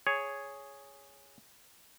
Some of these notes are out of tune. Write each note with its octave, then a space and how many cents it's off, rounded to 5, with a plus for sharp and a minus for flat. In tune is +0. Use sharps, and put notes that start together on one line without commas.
G#4 +0 C#5 +0